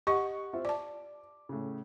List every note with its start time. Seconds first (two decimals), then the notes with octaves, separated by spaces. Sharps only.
0.07 G4 D#5 F#5 C#6
0.53 C4 F4 E5
0.65 D5 A5 D6
1.49 A2 C#3